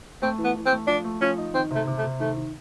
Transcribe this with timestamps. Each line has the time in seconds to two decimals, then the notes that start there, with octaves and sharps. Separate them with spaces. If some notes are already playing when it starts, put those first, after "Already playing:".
0.22 A3 C4
0.38 E3
0.44 B3
0.55 E3
0.66 C4
0.72 A3
0.87 F3 D4
1.04 A3
1.21 F3 C#4
1.38 D#4
1.54 D#3 C4
1.71 C3 A3
1.87 C3
1.98 A3
2.03 C3
2.20 D#3 A3
2.37 D#3